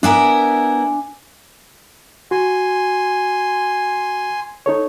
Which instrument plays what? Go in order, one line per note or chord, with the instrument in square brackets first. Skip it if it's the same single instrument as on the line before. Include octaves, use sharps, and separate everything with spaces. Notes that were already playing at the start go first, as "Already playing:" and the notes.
[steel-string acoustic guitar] B3 E4 A#4 [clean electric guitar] D4 G#5
[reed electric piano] F#4 [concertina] G#5 C6
[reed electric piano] D#4 A4 C#5